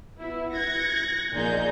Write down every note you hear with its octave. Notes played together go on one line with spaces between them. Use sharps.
B3 E4
F#6 G#6 A#6 C#7
A#1 A#2 F3 D#4 G#4 G6